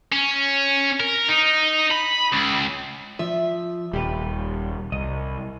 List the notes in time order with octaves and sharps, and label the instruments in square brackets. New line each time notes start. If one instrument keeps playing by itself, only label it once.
[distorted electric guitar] C#4
A#4
D#4
B5
C#2
[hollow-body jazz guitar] F3 [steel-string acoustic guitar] E5
[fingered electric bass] D#1 [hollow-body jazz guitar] G3 G4 B4
[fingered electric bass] C2 [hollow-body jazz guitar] D#5